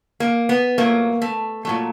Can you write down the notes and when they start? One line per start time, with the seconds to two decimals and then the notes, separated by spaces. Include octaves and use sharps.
0.20 A#3
0.49 B3
0.78 A#2 F#3 A3 A#3
1.22 A3
1.65 A#2 F#3 A3